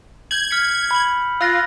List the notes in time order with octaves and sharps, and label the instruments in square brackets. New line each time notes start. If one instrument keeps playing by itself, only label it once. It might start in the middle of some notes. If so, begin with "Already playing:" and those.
[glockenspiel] G6 F#7 [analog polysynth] G#6
[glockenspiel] F6 B6 C#7
B5 F#7
[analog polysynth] F4 [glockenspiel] E6 F#6 A#6